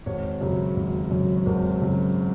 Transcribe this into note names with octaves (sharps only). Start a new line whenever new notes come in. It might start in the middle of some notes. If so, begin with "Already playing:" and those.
G#1 C#5
F#2 C#3 F#3
G#1
F#2 C#3 F#3
C#5
G#1 A#4
F#2 C#3 F#3